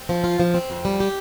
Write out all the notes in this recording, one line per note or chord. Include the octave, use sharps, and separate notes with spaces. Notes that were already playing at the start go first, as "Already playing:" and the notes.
Already playing: C4
F3
F4
F3
C4
F2
G3
G4